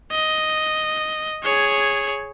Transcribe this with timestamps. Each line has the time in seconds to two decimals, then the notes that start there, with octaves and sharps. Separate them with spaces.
0.11 D#5
1.43 G#4 C#5